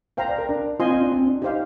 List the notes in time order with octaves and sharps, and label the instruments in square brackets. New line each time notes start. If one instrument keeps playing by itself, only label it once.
[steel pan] C5 F5 A#5 [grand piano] G5
[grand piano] D5
A#4
D4
[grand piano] C4 [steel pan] F4 C5 D#5 G#5 C6
[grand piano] C4
D4
C4
D4
[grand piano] D#4 [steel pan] G4 C5 F5